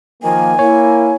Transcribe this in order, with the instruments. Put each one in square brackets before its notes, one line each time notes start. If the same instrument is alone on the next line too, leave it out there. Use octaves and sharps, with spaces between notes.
[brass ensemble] D#3 F3 A#3 [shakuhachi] G#5
[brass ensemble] A#3 [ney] E4 [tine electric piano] C#5